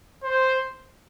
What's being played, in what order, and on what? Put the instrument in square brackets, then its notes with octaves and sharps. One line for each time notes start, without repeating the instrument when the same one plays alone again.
[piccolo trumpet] C5